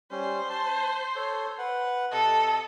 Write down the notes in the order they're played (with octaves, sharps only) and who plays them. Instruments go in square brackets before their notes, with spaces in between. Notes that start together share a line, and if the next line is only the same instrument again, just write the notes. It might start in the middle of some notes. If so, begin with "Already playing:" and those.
[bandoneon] G3 C#4 [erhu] C5
[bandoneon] A5
A4 C#5
B4 F#5
[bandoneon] C3 D#5 [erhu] A4